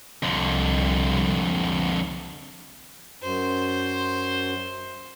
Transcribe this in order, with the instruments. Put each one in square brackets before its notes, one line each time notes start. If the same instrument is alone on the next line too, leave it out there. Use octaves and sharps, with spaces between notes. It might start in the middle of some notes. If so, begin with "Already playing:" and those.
[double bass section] C2 [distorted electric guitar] F2 D3
[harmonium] F#2 [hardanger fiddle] C5